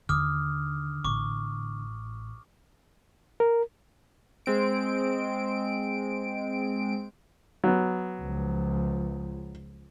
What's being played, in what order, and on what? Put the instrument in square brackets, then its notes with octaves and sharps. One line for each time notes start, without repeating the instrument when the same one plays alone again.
[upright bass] D#2 D#3 [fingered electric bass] D3 [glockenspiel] D6 D#6 F6
[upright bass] A1 A2 [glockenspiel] C#6 D6
[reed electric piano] A#4
[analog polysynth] G#3 C4 D7
[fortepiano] F#3 B3
[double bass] C#2 F3